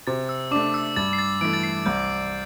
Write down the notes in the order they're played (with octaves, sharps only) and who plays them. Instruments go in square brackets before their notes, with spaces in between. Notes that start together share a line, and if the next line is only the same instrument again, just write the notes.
[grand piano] C3 [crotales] A6
[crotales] E6
[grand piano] A3 D4 [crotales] D6
[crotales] E6
[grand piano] G2 [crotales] A6
[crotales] C7
A6
[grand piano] E3 A3 [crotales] D7
[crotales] A6
C7
[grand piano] C2 [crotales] G6